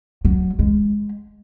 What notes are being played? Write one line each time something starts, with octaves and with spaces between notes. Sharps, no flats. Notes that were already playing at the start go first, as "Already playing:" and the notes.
F#3
G#3